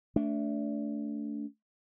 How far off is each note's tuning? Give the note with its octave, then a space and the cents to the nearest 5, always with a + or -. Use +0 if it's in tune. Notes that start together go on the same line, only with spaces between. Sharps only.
A3 +0 D4 -25